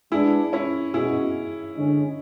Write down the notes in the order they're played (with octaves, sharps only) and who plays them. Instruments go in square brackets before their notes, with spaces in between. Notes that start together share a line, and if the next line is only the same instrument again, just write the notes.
[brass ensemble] G#3 B3 D4 [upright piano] E4 G#4
[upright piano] C#4 E4
[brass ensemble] B2 G#3 C#4 F#4 [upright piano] E4 G#4
[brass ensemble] D3 G#3 C#4